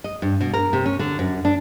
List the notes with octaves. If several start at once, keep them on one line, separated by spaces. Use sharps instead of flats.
D#5
G2
B2
A#4
C3
C#4
D3
F#2
D4